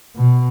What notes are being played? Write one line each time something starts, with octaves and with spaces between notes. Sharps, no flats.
B2